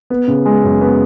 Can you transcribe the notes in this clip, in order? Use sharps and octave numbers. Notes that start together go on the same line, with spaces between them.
B3
C#3
G#3
F#2
B3